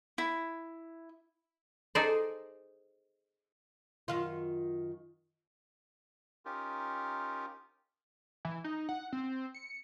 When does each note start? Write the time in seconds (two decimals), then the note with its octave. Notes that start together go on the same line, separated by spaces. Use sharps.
0.18 E4
1.95 D#4 G#4 A4 C5 D5
4.08 F#2 D#3 F4
6.45 C#4 D#4 F4 G4 A#4
8.45 E3
8.64 D#4
8.89 F#5
9.13 C4
9.54 C#7